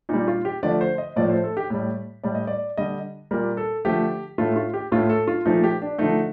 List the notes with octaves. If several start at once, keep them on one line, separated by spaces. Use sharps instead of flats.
A#2 G3 D#4
F4
G4
D3 F3 A3 D5
C5
D#5
A2 F3 A3 D5
C5
A4
G4
A2 G3
A2 G3 D5
D#5
D5
D3 G3 D#5
A#2 G3 A#4
A4
D3 F3 A3 G4
A2 A3 F4
F4
G4
A2 A3 F4
A4
F4
A#2 F3 A3 D#4
G4
D4
D3 F3 A3 D#4